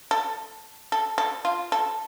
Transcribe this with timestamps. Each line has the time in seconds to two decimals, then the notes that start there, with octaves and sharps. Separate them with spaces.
0.11 A4
0.92 A4
1.18 A4
1.45 F4
1.72 A4